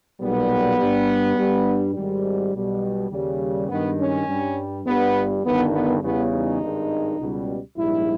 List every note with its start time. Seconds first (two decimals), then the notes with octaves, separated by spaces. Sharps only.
0.20 B1 A#2 G3 B3
0.78 G2 G3
1.37 G2 G3
1.94 G#1 G#2 G3
2.53 B1 B2 G3
3.11 D#2 C#3 G3
3.69 G2 D#3 G#3 B3
3.98 C#4
4.27 G2 G3
4.85 G1 G2 G3 B3
5.44 G1 G2 D#3 B3
5.72 B3
6.02 E2 C#3 G3 B3
6.31 D#4
6.60 G#1 G2 D#3 G#3
7.19 C#2 B2 G3
7.76 A#1 G#2 G3 E4